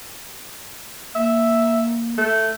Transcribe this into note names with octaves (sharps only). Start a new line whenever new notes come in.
A#3 E5
A3